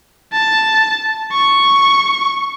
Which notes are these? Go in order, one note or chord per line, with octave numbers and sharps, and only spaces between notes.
A5
C#6